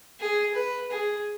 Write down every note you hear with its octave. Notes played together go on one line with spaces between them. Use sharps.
G#4
B4
G#4